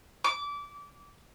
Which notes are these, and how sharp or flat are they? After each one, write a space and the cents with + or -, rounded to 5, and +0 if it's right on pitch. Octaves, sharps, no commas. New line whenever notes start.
D6 -25